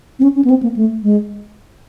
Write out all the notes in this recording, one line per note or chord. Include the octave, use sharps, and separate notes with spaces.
C4
C#4
C#4
B3
C4
A#3
A3
G#3